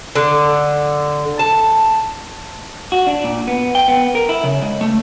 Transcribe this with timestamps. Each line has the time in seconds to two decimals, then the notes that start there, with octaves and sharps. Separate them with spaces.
0.15 D3
1.39 A5
2.92 F#4
3.07 D4
3.24 A#2
3.48 B3
3.75 G5
3.88 B3
4.15 A#4
4.29 E4
4.44 C#3
4.62 C#2
4.81 A3